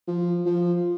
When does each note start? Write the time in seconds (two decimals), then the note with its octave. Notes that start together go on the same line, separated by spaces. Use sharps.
0.08 F3
0.46 F3